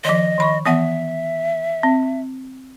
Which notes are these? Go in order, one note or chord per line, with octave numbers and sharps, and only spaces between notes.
D#3 F3 D#5
D#3 B5 C#6
E3 B3 E5 F#5
C4